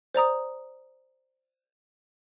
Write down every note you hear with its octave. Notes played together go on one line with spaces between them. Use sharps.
C5 D5 A#5 D#6